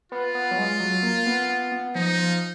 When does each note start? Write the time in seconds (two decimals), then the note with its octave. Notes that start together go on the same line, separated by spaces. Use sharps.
0.12 B3 F4
0.35 B3
0.51 F#3
0.58 G#3
0.80 F#3
1.03 A#3
1.26 B3
1.49 B3
1.72 B3
1.95 F3 D#4
2.18 F3